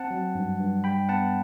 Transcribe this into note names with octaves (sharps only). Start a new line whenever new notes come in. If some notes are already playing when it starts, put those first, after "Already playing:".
Already playing: C4 F#5 A5
F#3
G2
G2
G3 G5 B5
B3 F#5 A5